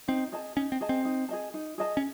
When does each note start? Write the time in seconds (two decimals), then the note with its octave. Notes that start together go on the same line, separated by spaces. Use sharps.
0.08 C4 D#4
0.32 G#4 D#5 A5
0.56 C#4 D#4
0.72 C4
0.81 G#4 D#5 A5
0.89 C4
1.05 D#4
1.29 G#4 D#5 A5
1.54 D#4
1.78 G#4 D#5 A5
1.97 C#4